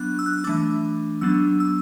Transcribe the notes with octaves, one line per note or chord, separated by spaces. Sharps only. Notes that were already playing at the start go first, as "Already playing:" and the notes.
Already playing: F#3 B3 D4 F#6
E6
F#6
E6
E3 A3 D4 D6
F#3 B3 D4 E6
E6